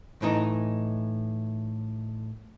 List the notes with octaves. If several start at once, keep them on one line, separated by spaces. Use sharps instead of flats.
A2 E3 D#4